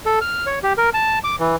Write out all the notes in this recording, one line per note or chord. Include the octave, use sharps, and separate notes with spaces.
A4
F6
C#5
G4
A#4
A5
D6
E3